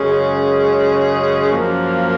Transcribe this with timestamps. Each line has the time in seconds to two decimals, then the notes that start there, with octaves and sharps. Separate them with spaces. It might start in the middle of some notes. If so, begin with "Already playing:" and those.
Already playing: F#2 C#3 G#3 C#4 G#4
1.52 F#2 F3 A#3